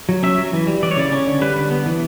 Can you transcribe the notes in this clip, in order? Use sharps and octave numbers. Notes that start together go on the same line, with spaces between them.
F#3
C#4 E5
F#3
E3
G3
E3 D5
C#5
C#3 D5
C#4
D3
G3 B4
D3
B3
E3